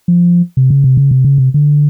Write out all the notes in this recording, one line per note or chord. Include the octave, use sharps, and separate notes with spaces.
F3
C3
C#3
C3
C#3
C3
C#3
C3
D3